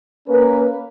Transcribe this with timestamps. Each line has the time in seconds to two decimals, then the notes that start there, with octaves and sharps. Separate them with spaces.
0.28 A#3 C#4 A#4 B4